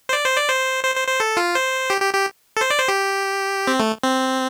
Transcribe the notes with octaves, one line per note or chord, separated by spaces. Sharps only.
C5
D5
C5
D5
C5
C5
C5
C5
A4
F4
C5
G4
G4
G4
A4
C5
D5
C5
G4
C4
A3
C4